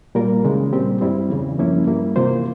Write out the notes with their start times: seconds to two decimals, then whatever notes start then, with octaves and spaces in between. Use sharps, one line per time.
0.15 A#2 G3 A#3 F4 A#4
0.44 C#2 C#3 E3 G#3 C#4
0.73 A#2 G3 C4 G4
1.01 G2 G3 C4 E4
1.30 E2 C#3 E3
1.59 G2 F3 A#3 C#4 E4
1.87 G2 G3 A#3 E4
2.16 C3 E3 A#3 F4 C5